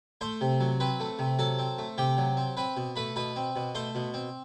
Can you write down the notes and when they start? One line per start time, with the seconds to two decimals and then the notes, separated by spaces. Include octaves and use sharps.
0.21 A3 C5 C6
0.41 C3
0.60 F#3
0.80 C4 B4 B5
1.00 A3
1.19 C3
1.39 F#3 A4 A5
1.59 C4
1.78 A3
1.98 C3 G4 G5
2.17 F#3
2.37 C4
2.57 C4 B4 B5
2.77 B2
2.96 A3 B4 B5
3.16 B2 B4 B5
3.36 C4
3.56 B2
3.75 A3 C5 C6
3.95 B2
4.14 C4